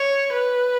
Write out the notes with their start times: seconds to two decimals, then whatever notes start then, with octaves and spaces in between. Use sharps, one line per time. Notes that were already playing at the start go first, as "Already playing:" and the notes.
Already playing: C#5
0.32 B4